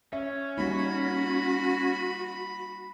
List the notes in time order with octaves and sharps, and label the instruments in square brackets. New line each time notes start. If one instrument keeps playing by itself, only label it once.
[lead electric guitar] C#4 [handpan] E5
[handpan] G3 A#3 D#4 [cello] F#4 [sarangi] B5